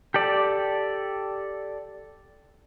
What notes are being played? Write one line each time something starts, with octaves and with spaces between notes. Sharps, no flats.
G4 A4 D5